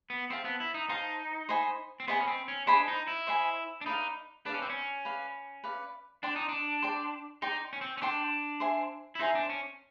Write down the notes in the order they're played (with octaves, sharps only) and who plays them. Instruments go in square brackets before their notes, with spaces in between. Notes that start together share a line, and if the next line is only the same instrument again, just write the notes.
[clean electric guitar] B3
[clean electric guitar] C4 [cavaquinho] C5 F5 A5
[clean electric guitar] B3
E4
D#4
[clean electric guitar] D#4 [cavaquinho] C5 F5 A5
[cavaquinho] C5 D#5 G#5 B5
[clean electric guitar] C4
[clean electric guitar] B3 [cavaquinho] C5 D#5 G#5 B5
[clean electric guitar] C#4
C4
C#4
[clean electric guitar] D4 [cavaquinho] C5 D#5 G#5 B5
[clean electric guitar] D#4
E4
[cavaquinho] C5 D#5 G#5 B5
[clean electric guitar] D4
[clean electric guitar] D#4 [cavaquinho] B4 D5 F5
[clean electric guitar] D4 [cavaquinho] B4 D5 F5
[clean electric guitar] C#4
C4
C#4
[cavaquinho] B4 D5 F5
B4 D5 F5
[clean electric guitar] D4 [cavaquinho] D5 G5 C6
[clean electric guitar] D#4
D4
[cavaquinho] D5 G5 C6
[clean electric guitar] D#4 [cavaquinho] D5 G5 C6
[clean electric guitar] C#4
C4
C#4
[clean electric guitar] D4 [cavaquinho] D5 G5 C6
[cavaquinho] C5 E5 G#5 C6
[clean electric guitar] E4
[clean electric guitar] D#4 [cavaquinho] C5 E5 G#5 C6
[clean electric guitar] D4
C#4